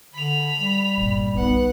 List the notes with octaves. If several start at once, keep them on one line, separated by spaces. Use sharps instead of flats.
D3 B5 F7
G3
G1 A#2
B1 B3 D#4 F#5